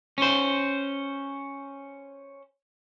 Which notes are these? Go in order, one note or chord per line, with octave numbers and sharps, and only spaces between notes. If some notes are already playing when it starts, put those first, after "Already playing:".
C#4 C5